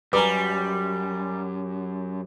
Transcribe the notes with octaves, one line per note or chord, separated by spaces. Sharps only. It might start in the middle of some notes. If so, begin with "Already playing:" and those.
F#2 G3 B4 G#5 A#5 D6